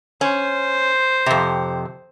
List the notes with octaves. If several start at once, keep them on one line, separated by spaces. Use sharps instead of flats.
C#4 C5
F2 C3